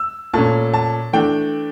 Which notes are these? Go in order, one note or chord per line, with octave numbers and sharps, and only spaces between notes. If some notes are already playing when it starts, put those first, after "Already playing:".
Already playing: E6
A#2 A3 C#4 A5
A5
E3 A3 D4 G5